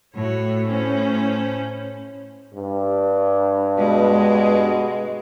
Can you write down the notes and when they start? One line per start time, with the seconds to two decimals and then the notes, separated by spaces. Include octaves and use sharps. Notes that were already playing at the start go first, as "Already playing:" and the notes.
0.15 A2 F#4 C#5
0.67 C#4 C5
2.54 G2
3.78 B2 G#3